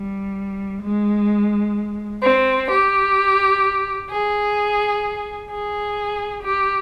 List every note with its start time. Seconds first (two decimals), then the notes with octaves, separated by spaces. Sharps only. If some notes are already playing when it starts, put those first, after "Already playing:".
Already playing: G3
0.83 G#3
2.23 C4
2.69 G4
4.10 G#4
5.50 G#4
6.43 G4